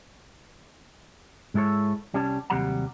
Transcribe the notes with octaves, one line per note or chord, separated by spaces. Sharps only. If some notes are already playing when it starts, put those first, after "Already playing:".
G#2 G#3 E4 A4 C#5
C2 G3 C#4 C#5 A5
D#2 C3 F#3 G3 F#5 A#5